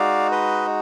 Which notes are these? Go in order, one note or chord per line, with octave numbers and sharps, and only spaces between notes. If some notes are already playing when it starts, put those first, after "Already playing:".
Already playing: G#3 D#4 F#4 D5 F5
B4 D#5